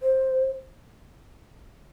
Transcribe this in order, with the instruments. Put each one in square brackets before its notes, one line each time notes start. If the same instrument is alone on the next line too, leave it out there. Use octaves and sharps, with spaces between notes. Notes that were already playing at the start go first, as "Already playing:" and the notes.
[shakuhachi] C5